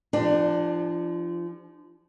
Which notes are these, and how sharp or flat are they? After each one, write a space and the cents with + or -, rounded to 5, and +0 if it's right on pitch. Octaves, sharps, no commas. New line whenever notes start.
F3 -25 D4 +20 G4 +0